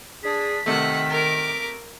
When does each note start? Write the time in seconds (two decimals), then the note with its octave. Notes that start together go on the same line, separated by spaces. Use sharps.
0.23 D4 G#4 B6
0.66 C3 D#3 A3 F#5
1.09 A#4 D6